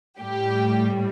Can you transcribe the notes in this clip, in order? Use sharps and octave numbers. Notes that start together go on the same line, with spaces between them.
A2 G3 G4